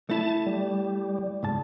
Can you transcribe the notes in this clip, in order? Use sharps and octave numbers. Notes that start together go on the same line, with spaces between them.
A3 E4 A5
G3
C#2 G#2 A5